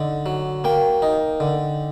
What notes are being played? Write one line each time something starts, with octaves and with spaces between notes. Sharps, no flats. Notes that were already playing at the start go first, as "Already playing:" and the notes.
Already playing: D3 D#4
F#3
A#3 G5
D#4
D3